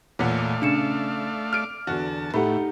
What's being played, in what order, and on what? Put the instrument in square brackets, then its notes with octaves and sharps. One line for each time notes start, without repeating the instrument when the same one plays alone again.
[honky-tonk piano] E2 A#2 F#5 [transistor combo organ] A3 D5 F5 [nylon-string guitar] C#5
[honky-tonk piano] C#3 [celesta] D4 C#7 E7
[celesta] D6 [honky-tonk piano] F6 D7
[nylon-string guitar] E2 D3 [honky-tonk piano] F#4 [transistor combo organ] A5
[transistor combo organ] A2 [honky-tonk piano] A3 [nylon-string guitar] D#4 G4 F#5 [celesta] B5